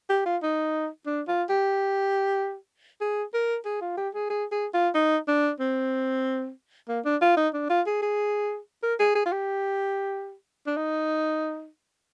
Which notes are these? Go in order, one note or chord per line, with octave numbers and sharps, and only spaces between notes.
G4
F4
D#4
D4
F4
G4
G#4
A#4
G#4
F4
G4
G#4
G#4
G#4
F4
D#4
D4
C4
A#3
D4
F4
D#4
D4
F4
G#4
G#4
A#4
G#4
G#4
F4
G4
D4
D#4